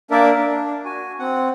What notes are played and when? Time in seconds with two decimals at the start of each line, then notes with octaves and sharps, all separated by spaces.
0.11 A#3 D4 A#4 D5 E5
0.38 D4
0.85 F#4 G#5
1.19 C4 F#5